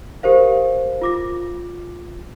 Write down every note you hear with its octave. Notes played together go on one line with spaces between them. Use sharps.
G4 A#4 C5 F5
F4 D6 A#6